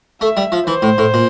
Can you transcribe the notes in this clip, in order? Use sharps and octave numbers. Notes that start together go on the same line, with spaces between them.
A3 E5
G3
F3
E3 C5
A2
A2
A#2